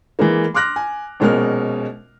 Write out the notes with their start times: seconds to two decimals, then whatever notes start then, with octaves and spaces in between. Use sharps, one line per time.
0.19 E3 G#3 A#3
0.54 C6 D6 F6 F#6 A#6
0.76 G#5
1.20 A#1 B2 G#3 C#4 A#4 F6